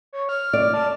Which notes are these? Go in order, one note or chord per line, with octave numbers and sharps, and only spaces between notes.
C#5
F6
D5
A5